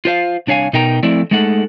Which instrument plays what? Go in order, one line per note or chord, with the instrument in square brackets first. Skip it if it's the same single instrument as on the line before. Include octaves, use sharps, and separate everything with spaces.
[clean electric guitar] F4 C5 F5
C2 D4 C#5 F5 G#5
B2 D#4 A#4 G5 A#5
F3 A3 C4 E4 D5
G#3 A3 D#4 A4 F#5